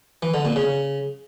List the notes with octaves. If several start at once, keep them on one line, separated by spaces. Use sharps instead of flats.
E3
D3
A#2
C#3